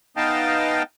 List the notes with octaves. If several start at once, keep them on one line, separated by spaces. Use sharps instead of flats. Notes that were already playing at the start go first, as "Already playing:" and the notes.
B3 D#4 D#5 F5 G5 A5